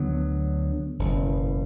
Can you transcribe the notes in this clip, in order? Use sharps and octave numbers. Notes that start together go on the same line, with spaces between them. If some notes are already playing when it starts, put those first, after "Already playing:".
Already playing: D2 D3 F#3 B3
F#1 E2 B2